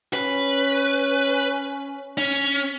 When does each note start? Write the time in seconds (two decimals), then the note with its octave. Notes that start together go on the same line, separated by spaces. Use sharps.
0.14 C#4 B4
2.17 C#4